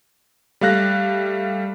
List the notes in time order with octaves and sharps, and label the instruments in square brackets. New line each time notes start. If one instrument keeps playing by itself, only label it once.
[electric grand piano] G3 A3 F5 F#6 A#6